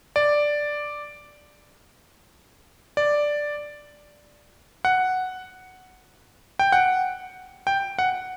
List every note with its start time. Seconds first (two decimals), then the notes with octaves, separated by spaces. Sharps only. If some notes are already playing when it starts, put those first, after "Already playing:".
0.16 D5
2.97 D5
4.85 F#5
6.59 G5
6.72 F#5
7.67 G5
7.99 F#5